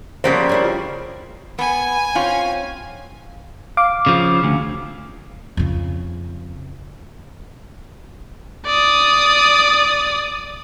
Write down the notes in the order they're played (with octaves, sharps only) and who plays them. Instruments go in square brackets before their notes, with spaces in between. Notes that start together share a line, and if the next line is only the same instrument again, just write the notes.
[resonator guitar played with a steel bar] C#3 G3 A#3 [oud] F3 B3 B4 [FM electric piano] C5
[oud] C#4 D4 E4
[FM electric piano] F4
[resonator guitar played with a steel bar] B3 [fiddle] G#5
[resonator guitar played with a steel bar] C4 C#4 F4
[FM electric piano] F5 D6
[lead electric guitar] C#3 F3
D2
[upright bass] F2 C#3
[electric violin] D5 D#6